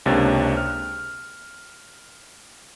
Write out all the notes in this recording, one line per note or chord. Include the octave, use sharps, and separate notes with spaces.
C#2 C3 A#3 D4 C#5 A6
F6